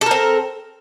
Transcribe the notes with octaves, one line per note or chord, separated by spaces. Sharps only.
C4 A4 A#4